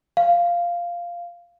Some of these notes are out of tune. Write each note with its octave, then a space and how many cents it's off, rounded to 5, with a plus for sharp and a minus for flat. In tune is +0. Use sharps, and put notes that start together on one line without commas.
F5 -5